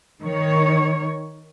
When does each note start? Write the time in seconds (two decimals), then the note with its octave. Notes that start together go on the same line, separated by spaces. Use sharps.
0.22 D#3 C#5